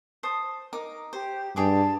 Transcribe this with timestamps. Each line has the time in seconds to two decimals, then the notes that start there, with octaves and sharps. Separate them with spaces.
0.23 C5 A5 D#6
0.73 D#4 A#4 D6
1.13 G4 C5
1.56 G2 G4 G#4 A5 D6